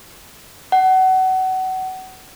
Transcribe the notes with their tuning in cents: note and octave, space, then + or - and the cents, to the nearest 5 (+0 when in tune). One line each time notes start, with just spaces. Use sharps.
F#5 +25